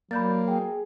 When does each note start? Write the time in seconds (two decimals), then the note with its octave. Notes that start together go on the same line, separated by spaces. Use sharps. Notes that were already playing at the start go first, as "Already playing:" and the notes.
0.11 F#3 A#3 D5 B5 G6 A6
0.48 G#4 G5